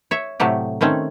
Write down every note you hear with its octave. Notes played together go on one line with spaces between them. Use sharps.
C#5 E5
A2 C3 F#3 A3 G4
D#3 A3 C4 C#4